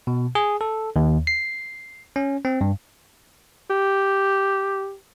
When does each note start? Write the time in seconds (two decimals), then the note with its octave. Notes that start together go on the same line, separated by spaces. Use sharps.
0.07 B2
0.35 G#4
0.61 A4
0.96 D#2
1.27 C7
2.16 C#4
2.45 C4
2.61 G2
3.70 G4